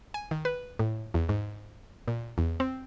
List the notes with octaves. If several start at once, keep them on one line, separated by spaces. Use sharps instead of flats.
G#5
D#3
B4
A2
E2
G#2
A#2
E2
C4